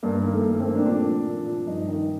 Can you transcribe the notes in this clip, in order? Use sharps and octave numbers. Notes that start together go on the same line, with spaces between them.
G2 A#3
D#3 A#3
A3
G2
A3
C4
D#3 A#3
D4
A#2 D4
F3
A#2
F3
G2 D#4
D#3